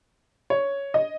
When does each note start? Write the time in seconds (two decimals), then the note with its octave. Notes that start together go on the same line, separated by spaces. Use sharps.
0.50 C#5
0.94 D#5